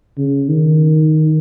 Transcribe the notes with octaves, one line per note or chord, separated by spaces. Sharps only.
C#3
D#3